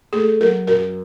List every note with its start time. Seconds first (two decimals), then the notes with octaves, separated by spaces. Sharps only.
0.13 A3 G#4
0.41 F#3 A#4
0.67 F#2 A#4